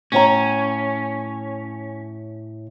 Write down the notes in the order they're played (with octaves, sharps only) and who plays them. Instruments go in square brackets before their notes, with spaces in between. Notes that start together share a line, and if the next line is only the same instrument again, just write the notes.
[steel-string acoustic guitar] A2 C#5 A#5 [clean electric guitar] C#4